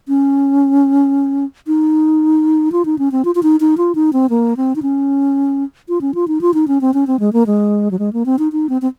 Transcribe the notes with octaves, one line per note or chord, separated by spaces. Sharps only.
C#4
D#4
F4
D#4
C#4
C4
F4
F4
D#4
D#4
F4
D#4
C4
A#3
C4
D#4
C#4
F4
C#4
F4
D#4
F4
D#4
C#4
C4
C#4
C4
G#3
A#3
G#3
F#3
G#3
A#3
C4
D#4
D#4
C4
C4